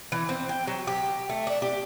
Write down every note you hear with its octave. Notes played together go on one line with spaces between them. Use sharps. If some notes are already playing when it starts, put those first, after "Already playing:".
E3
C4
G5
F#3
G4
A3
D4
G4